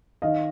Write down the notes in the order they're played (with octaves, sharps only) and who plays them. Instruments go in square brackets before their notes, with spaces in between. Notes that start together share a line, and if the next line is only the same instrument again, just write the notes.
[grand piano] D#3 D#5 F5